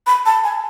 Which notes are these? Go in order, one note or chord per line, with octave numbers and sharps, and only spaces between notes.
B5
A5
G#5